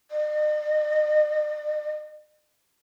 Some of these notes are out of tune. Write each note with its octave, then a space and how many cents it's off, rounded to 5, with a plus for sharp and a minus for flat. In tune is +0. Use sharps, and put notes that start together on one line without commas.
D#5 -45